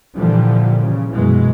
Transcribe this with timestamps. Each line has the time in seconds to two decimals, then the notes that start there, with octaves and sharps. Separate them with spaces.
0.16 A#2 D3 E3 F3 G3
0.82 C#3
1.15 F#2 B2 E3 F#3 G#3